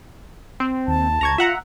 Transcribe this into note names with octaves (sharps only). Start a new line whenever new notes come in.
C4
D#2 A5
C#2 A#5 C#6 G#6
F4 E5 F#5 A#5